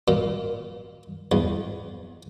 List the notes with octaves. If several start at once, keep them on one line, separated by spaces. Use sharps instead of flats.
A#2
E2